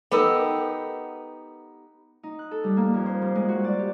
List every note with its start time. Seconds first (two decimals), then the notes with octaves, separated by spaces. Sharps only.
0.12 B3 D#4 G4 A4 A#4
2.23 D#4
2.39 F#6
2.51 A4
2.64 G3
2.77 A#3
2.94 F2
3.06 C5
3.22 G3
3.35 G#3
3.49 F#4
3.64 D5
3.79 G4